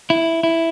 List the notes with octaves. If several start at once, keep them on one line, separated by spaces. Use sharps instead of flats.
E4
E4